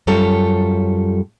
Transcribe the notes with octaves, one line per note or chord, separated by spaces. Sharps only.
F#2 G3 F4 A4 C#5